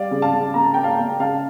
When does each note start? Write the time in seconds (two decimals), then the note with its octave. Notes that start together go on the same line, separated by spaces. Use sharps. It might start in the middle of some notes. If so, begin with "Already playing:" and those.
Already playing: G3 D5 F5
0.11 C#3
0.22 F5 A5
0.33 C#3
0.54 A#3 A#5
0.64 A5
0.74 A#3 G5
0.83 F5 A5
0.99 A#3
1.20 C#3 F5 A5